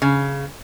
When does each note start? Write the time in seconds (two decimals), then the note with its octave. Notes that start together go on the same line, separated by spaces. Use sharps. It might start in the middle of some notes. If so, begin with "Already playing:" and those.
0.02 C#3